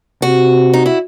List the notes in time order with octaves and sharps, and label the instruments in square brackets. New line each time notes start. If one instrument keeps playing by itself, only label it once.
[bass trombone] C3 [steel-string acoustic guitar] F#4
[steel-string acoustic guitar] D#4
E4